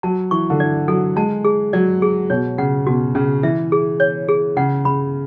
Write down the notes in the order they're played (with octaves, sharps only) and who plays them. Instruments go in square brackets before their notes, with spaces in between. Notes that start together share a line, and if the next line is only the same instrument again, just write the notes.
[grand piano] F#3 [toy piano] A5
[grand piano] E3 [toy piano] C#6
[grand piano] D3
[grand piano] E3 [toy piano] D5
[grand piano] F#3 [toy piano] A4
[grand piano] G#3 [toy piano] A5
[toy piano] G#4
[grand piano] F#3 [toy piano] D5
[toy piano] G#4
[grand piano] B2 [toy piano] C#5
[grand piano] C#3 [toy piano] F#5
[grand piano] B2 [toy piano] F#4
[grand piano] C#3 [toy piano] C#4
[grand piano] E3 [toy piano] E5
[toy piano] G#4
C#5
G#4
[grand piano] C#3 [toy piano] F#5
[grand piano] C#3 [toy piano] B5